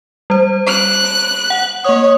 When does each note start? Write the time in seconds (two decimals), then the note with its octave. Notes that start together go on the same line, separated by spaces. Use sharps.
0.30 G3 C5
0.68 F#6 D7
1.50 F#5
1.85 A#3 C#5 D#6